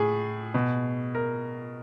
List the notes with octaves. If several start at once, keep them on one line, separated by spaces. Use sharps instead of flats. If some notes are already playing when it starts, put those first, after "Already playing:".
Already playing: A2 G#4
B2
A#4